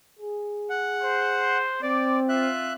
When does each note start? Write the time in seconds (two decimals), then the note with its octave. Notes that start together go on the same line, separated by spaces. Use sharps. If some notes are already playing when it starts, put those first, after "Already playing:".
0.19 G#4
0.70 F#5
1.02 C5
1.82 C4 D5 D6
2.29 F4 E5 F#6